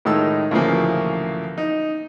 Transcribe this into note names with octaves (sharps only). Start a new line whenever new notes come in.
A2 D#3 G#3 D#4 A5 E6
D2 A#2 C#3 E3 F3 A#3
D#4